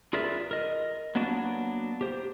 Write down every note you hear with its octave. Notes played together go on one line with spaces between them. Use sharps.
F4 G#4 A#4 B4 D5 E5
A#4 D#5
F#3 A#3 B3 D4 F#4
G4 C5